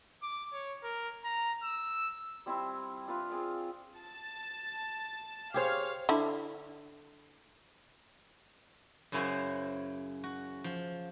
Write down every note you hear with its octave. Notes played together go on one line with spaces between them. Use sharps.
D6
C#5
A#4
A#5
E6
G3 C4 E4 C#6
D4 F4 B4 E5
C4 G#4 D5 F5
A5
G4 G#4 C5 C#5 F5
D3 E4
F#2 C#3 C#4 E4 F#4 C5
F#4
F3